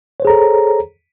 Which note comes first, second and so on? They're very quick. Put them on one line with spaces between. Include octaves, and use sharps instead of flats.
C#5 C5 G#4 A#5 A4